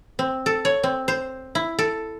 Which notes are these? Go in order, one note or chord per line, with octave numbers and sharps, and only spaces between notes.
C4
A4
C#5
C4
C5
E4
A4